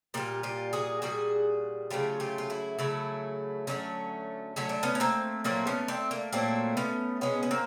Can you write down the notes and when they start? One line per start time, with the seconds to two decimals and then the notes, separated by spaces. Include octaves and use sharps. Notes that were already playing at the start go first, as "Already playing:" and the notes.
0.14 A#2 G3 F4 G4
0.43 F4 G4
0.73 F#4 G#4
1.02 A#2 G3 F#4 G#4
1.90 C#3 F#3 A3 F4 G4
2.20 F4 G4
2.38 F4
2.50 E4 F#4
2.79 C#3 F#3 A3 E4 F#4
3.67 D3 F#3 A3 C#4 D#4
4.56 D3 F#3 A3 C#4
4.69 D4
4.83 B3 C#4
4.95 C#4
5.00 A#3 C4
5.44 A#2 F#3 A3 A#3 C4
5.67 B3 C#4
5.88 C4 D4
6.11 A#3
6.33 A#2 F#3 A3 A#3 C4
6.77 B3 C#4
7.21 B2 G#3 B3 C#4
7.43 B3
7.51 A#3 C4